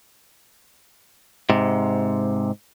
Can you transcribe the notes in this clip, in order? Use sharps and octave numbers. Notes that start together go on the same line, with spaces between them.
G#2 C3